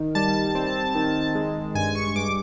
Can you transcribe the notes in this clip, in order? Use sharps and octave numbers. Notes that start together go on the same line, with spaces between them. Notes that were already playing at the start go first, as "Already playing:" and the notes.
Already playing: D#3
G3 A5
C4
D#3
G#3
G2 G#5
C#6
G2 D6